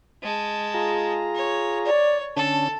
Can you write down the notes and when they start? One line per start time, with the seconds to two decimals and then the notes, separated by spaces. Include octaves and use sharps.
0.22 G#3 A5
0.74 F4 G#4 A#5
1.35 C#5
1.86 C#5 D5
2.37 D3 C#4 A4 A5